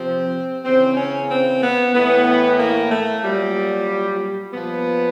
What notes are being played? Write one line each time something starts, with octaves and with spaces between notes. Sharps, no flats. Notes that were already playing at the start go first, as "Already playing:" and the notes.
Already playing: C3 F3 C4
C#3 E3 C4
C#4
C4
B3
A2 E3 B3
A#3
A3
A#2 F#3 G3
A#2 F3 B3